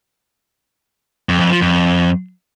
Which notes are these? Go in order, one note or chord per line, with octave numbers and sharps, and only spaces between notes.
F2
F2
F3
F2